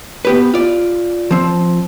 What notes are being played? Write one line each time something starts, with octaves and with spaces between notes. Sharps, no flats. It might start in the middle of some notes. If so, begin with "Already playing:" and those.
B3 G4 B4
F4 D5
F3 C4